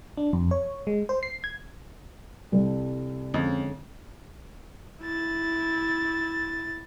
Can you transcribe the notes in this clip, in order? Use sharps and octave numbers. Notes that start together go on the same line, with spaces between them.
D4
F2
C#5
G#3
C5
C7
G#6
C2 E3 A4
F2 D3 G#3 C#4
E4 A6